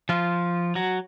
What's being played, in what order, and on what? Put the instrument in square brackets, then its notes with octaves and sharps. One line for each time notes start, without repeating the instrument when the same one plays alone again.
[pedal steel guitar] F3 F4
F#3 F#4